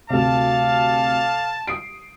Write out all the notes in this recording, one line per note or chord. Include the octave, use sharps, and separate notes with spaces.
D2 C3 A4 D5 F5 A5
D#6 C7 D7